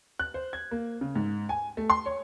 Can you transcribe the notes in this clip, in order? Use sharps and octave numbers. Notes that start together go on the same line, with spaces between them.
F#6
C5
G#6
A#3
C#3
G#2
G#5
A3
C6
C#5